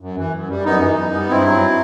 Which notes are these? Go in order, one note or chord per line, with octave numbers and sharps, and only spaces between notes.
F#2
E3
F#2
G3
F#2 B3 D#4
E3
F#2
G3
G2 C4 E4
F#3